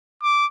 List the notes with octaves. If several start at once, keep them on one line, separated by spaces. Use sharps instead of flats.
D6